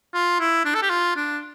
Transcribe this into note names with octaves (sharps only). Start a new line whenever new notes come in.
F4
E4
D4
A4
G4
F4
D4